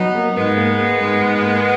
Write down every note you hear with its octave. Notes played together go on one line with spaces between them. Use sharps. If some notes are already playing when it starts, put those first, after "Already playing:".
Already playing: F#3 B3 D#4
A#3
G#2 G#3 B3
A#3
A#3
G#2
G#2
A#3